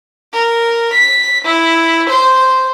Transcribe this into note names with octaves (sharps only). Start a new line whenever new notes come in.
A#4
B6
E4
C5